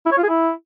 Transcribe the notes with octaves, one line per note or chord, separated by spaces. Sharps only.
E4
C#5
F4
G#4
E4